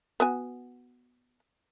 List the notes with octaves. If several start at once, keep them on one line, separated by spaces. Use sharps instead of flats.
B3 F#4 G#5